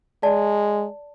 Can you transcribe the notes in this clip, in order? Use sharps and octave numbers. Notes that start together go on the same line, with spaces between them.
G#3 D5 A5